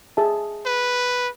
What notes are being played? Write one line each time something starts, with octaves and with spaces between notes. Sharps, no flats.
G#4 E5 A5
B4